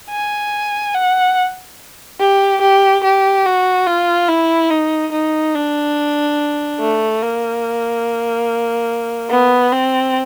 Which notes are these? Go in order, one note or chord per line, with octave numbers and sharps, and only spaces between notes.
G#5
F#5
G4
G4
G4
F#4
F4
E4
D#4
D#4
D4
A3
A#3
B3
C4